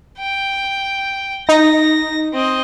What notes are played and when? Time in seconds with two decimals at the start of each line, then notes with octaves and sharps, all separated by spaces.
0.19 G5
1.49 D#4 A#6
2.33 C4 D#5